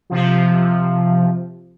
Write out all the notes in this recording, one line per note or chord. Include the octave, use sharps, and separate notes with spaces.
C3 F3